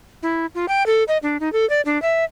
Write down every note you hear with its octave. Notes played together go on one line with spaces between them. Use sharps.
E4
F4
G5
A4
D#5
D4
D#4
A4
D5
D4
E5